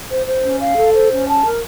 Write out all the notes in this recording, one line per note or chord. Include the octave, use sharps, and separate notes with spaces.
C5
C5
C#4
F5
A4
C5
C#4
A5
A#4